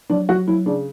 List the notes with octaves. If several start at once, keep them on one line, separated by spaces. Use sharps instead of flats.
F#3 D4
F#3 F#4
F#3 E4
C#3 D4